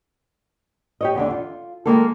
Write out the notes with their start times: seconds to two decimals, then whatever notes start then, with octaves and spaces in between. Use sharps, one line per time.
1.01 G4 C#5 D#5
1.15 E2 D3 D4
1.30 F4
1.86 D#3 F3 G#3 A#3 F4 A4